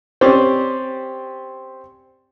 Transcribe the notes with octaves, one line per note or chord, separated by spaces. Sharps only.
C4 C#4 G4 C5 D5